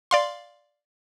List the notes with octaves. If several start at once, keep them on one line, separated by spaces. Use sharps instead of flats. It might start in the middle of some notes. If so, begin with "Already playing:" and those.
D5 F5 C6